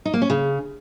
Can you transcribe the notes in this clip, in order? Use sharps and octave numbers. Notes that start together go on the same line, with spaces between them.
D#4
A#3
C#4
C#3